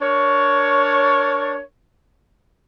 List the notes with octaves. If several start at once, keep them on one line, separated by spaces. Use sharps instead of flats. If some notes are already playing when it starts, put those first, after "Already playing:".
D4 A#4 C#5